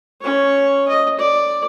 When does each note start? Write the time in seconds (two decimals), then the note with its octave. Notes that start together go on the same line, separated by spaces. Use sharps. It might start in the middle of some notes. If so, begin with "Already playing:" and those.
0.22 C#4 C#5
0.88 D#5
1.19 D5